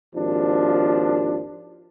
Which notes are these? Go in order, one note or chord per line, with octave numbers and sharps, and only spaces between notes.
G#1 D#2 F3 D4